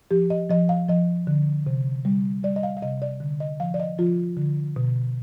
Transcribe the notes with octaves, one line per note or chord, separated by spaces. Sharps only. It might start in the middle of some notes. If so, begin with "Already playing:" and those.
F3 G4
D#5
F3 D#5
F5
F3 D#5
D3
C3
G3
G3 D5
D#5
F5
F5
C3 D#5
D5
D3
D#5
F3 F5
D5
D#5
F3 F4
D3
B2